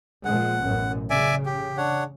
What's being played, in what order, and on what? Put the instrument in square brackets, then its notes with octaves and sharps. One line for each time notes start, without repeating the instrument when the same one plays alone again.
[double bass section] A#2 F3 G#3 [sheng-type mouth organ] F#5
[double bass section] A1 F#2 B2
[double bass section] C#3 [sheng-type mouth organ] D5 E5 G#5
[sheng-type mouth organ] G4
D4 C#5 F#5